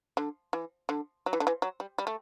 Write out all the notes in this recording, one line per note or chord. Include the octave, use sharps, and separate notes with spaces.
D3
E3
D3
F#3
E3
D3
E3
F#3
G3
G3
A3